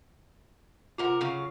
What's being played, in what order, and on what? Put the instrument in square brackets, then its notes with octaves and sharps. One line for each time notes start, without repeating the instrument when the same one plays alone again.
[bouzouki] C3 A#4 A#5 [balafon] F4 F#5
[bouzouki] C#3 F#3 F5